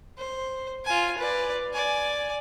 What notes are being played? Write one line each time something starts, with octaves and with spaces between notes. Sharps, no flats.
C5
F4 G#5
B4 D5
D5 G#5